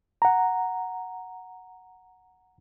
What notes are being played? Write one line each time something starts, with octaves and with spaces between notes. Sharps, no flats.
F#5 A#5